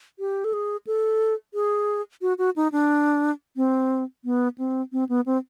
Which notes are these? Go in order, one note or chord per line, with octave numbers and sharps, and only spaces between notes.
G4
A4
G#4
A4
G#4
F#4
F#4
D#4
D4
C4
B3
C4
C4
B3
C4